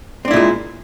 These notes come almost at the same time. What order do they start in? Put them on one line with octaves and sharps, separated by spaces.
C4 D4 E4 A#2 G#3